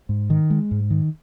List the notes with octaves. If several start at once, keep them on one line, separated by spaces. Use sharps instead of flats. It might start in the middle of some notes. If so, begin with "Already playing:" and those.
G#2
D#3
G#3
G#2
D#3